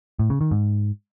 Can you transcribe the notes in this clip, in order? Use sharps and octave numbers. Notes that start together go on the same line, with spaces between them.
A2
C#3
D#3
G#2